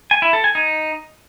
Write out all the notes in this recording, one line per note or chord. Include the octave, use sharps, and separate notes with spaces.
G#5
E4
A4
G#5
D#4